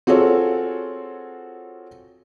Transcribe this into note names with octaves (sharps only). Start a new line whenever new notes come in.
C4 F4 F#4 G#4 A4 C#5